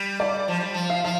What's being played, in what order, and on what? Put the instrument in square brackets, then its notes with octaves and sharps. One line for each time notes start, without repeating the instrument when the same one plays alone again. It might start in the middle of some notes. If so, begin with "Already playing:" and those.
Already playing: [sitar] G3
[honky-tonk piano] D5
[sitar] F3
G3
F3
[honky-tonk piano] F5
[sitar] F3 [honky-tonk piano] F5